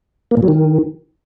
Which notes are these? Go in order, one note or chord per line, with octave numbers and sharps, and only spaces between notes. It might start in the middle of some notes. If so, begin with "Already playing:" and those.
A#3
A#2
F#3
D#3